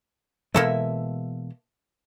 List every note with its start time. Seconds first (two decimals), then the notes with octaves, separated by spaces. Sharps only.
0.54 B2 E3 G#3 A#3 A4 E5